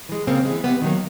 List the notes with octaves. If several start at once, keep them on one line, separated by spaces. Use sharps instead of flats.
E3 G#3
C#3 A#3 C4
G#3
E3
C3 B3
D#3 F#3 A#3